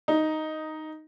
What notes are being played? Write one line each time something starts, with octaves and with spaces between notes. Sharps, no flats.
D#4